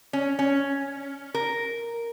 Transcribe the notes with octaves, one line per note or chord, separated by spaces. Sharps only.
C#4
C#4
A#4